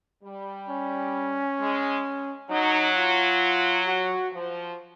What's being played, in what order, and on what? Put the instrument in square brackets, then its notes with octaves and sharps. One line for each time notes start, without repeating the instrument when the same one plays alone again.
[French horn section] G3
[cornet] C#4
[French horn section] G#3
[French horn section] F#3 [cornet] D#4
[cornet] F4
F#4
[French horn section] F3